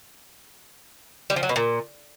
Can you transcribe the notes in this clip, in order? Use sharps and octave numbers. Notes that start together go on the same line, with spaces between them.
G3
F3
F#3
B2
A#2